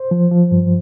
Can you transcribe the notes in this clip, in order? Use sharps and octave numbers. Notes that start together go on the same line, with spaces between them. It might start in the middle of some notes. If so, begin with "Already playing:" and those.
Already playing: C5
F3
F3
G2